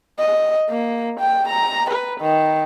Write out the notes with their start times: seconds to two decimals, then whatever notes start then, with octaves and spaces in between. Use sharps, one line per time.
0.19 D#5
0.70 A#3
1.20 G5
1.48 A#5
1.90 B4
2.20 D#3